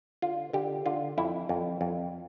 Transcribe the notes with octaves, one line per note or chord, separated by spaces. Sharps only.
D3 F4
D3 G4
D3 F4
F2 E4
F2
F2